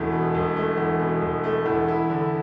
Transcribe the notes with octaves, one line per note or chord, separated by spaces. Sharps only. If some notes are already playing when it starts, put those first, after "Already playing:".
Already playing: E1 E2 B2 A3
B2
E1
A3
E2
B2
E1
A3
E2
E4
D3